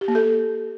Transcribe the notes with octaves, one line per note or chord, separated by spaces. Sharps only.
G4
A#3
A4